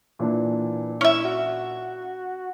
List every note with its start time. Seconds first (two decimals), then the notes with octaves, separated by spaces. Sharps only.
0.19 A#2 E3 D4
1.01 C#4 E4 E5
1.25 F#4